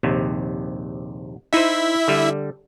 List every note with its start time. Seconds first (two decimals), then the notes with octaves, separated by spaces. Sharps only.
0.03 A#1 D#2 C3
1.53 D#4 E4 C5 E5
2.08 D3 G3